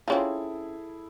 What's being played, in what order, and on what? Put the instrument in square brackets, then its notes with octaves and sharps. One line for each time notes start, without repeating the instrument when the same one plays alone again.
[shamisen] C4 C#4 F4 [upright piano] E4 G#4 A4